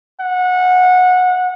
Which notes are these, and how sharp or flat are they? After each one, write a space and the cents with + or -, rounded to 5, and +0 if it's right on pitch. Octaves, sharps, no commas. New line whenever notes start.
F#5 -20